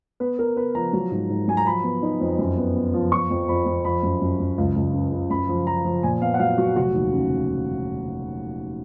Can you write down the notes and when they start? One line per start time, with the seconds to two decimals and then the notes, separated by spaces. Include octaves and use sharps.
0.20 B3 B4
0.38 B3 A#4
0.57 B3 B4
0.75 F3 A#5
0.93 F#3
1.11 G#2
1.30 G#2
1.48 F#3 G#5
1.57 A#5
1.66 F3 B5
1.84 B3
2.03 D#4
2.21 F2
2.39 F#2
2.57 B3
2.76 B3
2.94 F3
3.12 F3 C#6
3.30 F2
3.48 F2 B5
3.66 F2
3.84 F3 B5
4.03 F#2
4.21 F#2
4.40 F#2
4.58 C#2
4.76 C#2
4.94 C#3
5.12 C#3
5.30 F#2 B5
5.49 F3
5.67 F3 A#5
5.85 F3
6.03 A#2 G#5
6.22 B3 F5
6.34 F#5
6.40 F#3 F5
6.58 F#3 F#4
6.76 F1 F#4
6.94 D#2
7.13 C#3